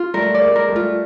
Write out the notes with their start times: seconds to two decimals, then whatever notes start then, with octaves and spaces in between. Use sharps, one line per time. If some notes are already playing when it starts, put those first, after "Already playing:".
Already playing: F4
0.14 G3 A3 A#4
0.34 D5
0.41 G#3 A#3
0.55 A#4
0.69 G3 A3
0.76 F4